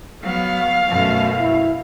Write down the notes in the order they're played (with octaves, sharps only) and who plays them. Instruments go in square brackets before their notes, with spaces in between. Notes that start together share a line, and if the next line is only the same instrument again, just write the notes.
[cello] F#3 B3 [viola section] F5
[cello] F#2 B2 [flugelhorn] A3
[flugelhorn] E4